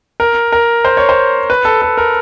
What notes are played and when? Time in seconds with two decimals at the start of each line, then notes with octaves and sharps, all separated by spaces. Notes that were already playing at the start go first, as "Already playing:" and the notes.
0.20 A#4
0.52 A#4
0.85 C5
0.97 C#5
1.09 C5
1.50 B4
1.65 A4
1.82 A4
1.98 A#4